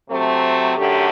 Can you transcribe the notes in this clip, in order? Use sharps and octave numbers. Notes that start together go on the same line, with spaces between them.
C3 F#3 A3 C4
F#2 D3 A3 G4